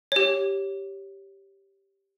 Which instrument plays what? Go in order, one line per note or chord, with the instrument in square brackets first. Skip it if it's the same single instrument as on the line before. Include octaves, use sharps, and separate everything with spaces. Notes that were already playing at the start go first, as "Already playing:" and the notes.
[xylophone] G4 C#5